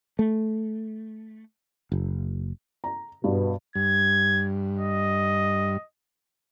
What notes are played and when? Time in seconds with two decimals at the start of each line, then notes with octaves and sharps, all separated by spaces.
0.19 A3
1.92 F#1
2.84 A#5
3.24 G2 B2
3.75 G2 G#6
4.79 D#5